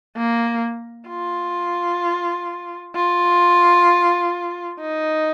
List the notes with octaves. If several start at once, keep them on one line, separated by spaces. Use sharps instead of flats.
A#3
F4
F4
D#4